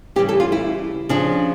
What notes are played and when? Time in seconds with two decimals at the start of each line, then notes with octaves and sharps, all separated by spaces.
0.16 C#3 E3 G3 G4
0.29 A4
0.40 F4
0.52 E4
1.09 C#3 F3 D4